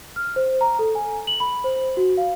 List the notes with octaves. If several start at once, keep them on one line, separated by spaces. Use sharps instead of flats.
F6
C5
A#5
A4
G#5
F#7
B5
C5
F#4
F5